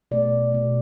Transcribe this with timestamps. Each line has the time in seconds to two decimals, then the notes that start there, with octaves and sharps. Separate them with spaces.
0.11 B2 A3 D5
0.52 B2 A3